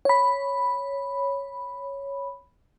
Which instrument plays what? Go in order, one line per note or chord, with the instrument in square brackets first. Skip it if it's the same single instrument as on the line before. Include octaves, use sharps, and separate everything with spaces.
[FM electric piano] C#5 B5